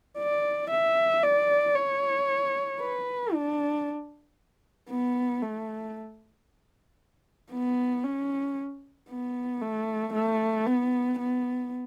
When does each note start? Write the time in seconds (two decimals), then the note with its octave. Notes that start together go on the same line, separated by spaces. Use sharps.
0.18 D5
0.71 E5
1.23 D5
1.76 C#5
2.80 B4
3.33 D4
4.90 B3
5.42 A3
7.52 B3
8.04 C#4
9.09 B3
9.62 A3
10.14 A3
10.66 B3
11.19 B3